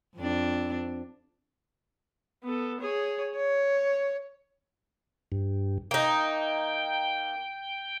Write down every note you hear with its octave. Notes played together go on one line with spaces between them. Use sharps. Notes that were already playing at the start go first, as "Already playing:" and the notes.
F2 C4 D4
B3 A4
G#4 C#5
C#5
G2
A#3 D#4 G5